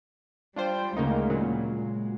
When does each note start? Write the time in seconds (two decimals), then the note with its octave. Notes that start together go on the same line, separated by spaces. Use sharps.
0.56 G3 D4 F4 C5 G5
0.96 D2 C#3 G#3 A#3 D#4
1.30 A#2 C#3 F#3
1.66 G#3